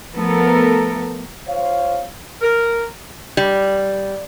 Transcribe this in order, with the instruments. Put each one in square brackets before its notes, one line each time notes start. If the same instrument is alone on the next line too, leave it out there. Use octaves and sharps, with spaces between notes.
[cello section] F3 A3 B3 A4 A#4
[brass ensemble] F4 C5 C#5 F5
[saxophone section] A#4
[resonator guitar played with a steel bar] G3